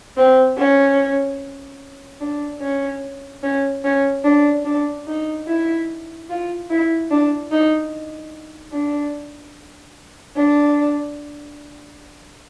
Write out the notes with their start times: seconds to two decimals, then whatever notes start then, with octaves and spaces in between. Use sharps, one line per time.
0.17 C4
0.57 C#4
2.21 D4
2.61 C#4
3.43 C#4
3.84 C#4
4.25 D4
4.65 D4
5.07 D#4
5.47 E4
6.30 F4
6.71 E4
7.11 D4
7.52 D#4
8.74 D4
10.37 D4